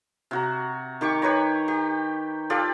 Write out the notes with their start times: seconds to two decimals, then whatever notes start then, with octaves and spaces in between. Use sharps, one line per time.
0.31 C3 F#4 A#5
1.01 D#3 G4 C#6 D6
1.22 G4 B4 C#5 A#5
1.68 G4
2.50 F4 G4 A4 D5